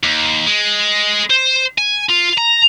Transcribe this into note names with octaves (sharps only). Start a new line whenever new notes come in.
D#2
G#3
C5
G#5
F4
A#5